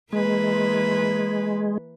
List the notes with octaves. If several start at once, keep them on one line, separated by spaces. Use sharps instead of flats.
E3 G#3 A#3 B4